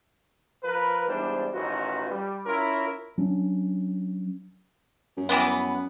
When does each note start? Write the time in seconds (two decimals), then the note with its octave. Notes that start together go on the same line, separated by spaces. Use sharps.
0.62 F3 A#4 B4
1.08 E2 G#2 G3 D4 C5
1.53 A1 D#3 F4 F#4 B4
2.11 G3
2.45 C#4 E4 F4 A#4
3.18 F#3 C#4 D4
5.17 F#2
5.29 E3 G3 B3